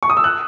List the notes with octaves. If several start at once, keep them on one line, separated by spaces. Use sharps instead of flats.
C#6
D#6
E6
F#6